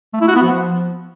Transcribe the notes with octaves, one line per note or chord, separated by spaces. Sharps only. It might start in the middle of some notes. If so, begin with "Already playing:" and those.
A3
E4
F#4
B3
F3